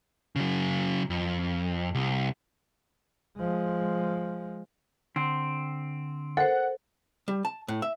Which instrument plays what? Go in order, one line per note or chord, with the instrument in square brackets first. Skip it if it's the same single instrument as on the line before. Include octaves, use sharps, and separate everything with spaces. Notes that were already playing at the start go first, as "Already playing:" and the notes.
[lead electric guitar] C#3 F#3
F2
C2
[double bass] F3 G#3
[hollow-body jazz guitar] D3 [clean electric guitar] C4
[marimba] A4 A#4 C5 [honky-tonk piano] F#5
[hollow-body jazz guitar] G3
A5
A2
E5